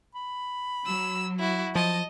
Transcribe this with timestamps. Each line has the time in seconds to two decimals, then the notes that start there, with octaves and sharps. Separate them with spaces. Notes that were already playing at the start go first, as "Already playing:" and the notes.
0.15 B5
0.86 F#3 E6
1.39 E4 F#4
1.75 F3 D#5 A5